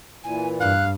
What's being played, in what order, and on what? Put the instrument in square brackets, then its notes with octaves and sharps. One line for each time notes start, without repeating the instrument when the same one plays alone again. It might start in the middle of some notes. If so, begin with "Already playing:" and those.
[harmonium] A#2 E3 [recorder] G#5
[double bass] G2 [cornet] F5 [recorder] F#6